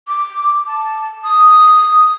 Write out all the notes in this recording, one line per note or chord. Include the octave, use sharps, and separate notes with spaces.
D6
A5
D#6